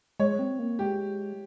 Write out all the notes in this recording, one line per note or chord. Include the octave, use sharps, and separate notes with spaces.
G#3 C#5
C4
A#3
G#3 G4